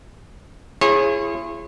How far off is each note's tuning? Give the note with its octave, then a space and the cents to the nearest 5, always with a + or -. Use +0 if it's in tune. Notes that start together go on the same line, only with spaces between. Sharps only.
E4 +40 G#4 +0 C#5 -35